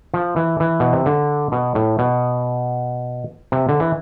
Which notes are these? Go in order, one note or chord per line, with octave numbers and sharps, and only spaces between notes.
F3
E3
E3
B2
C3
D3
B2
A2
B2
C3
D3
E3